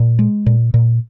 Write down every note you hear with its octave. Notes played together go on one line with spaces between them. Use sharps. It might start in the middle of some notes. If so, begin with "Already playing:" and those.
Already playing: A#2
G#3
A#2
A#2